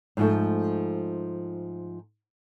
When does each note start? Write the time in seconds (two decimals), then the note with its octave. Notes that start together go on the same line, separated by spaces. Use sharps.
0.17 G#2 F3 A3